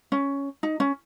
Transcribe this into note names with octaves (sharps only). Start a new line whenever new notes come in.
C#4
D#4
C#4